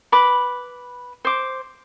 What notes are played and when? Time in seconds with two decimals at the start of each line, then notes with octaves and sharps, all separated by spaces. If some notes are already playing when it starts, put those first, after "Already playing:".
0.12 B4 B5 D6
1.25 C5 D6